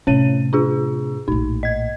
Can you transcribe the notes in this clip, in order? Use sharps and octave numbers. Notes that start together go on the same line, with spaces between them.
A2 C3 C#4 C#5 D#7
D4 F4 G#4
A#1 A2 D#4
D#5 G#6